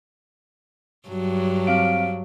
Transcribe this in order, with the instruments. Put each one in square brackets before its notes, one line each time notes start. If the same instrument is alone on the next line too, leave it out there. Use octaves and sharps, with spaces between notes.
[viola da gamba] G2 F#3
[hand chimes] C4 F5 D7